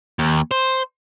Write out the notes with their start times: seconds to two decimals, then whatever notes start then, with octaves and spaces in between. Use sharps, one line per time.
0.19 D#2
0.51 C5